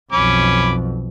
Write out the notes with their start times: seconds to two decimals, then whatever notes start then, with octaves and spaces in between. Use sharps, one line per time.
0.12 B1 F2 C#4 B5 D6